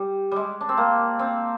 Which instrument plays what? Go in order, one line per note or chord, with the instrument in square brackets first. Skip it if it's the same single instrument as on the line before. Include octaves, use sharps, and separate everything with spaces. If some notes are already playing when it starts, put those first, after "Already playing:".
Already playing: [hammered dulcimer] G3
G3 G#3
D4
C4
A#3
C4